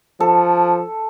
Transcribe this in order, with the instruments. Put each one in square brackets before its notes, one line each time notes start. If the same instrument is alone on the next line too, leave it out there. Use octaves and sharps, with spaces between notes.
[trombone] F3 [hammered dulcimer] A4